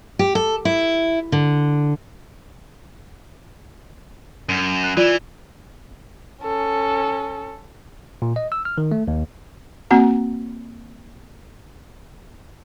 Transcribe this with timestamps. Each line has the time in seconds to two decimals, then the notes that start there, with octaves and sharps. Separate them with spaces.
0.19 G4
0.35 A4
0.65 E4
1.32 D3
4.49 F#2
4.84 F#6
4.97 E3 F4 D5 E7
6.43 C#4 A4
8.22 A#2
8.36 D#5
8.52 E6
8.65 F6
8.78 D#3
8.92 A3
9.08 D#2
9.91 A#3 C4 F#4 F#5 A#5